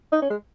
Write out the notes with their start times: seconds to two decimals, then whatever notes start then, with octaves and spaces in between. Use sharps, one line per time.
0.13 D#4
0.22 C#4
0.30 G#3